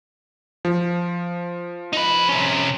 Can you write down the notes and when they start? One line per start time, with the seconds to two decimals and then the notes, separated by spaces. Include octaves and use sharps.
0.65 F3
1.93 D#4 B4
2.29 C3 C#4